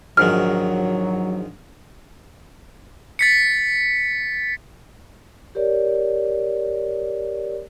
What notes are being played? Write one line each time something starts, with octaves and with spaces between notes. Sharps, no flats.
A#1 G#2 D#3 F#3 F6
A6 B6 C#7
G4 A#4 C#5 D5